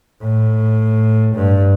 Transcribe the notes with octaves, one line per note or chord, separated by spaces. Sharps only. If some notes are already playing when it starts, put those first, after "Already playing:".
A2
G2